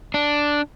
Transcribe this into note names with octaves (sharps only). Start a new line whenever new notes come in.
D4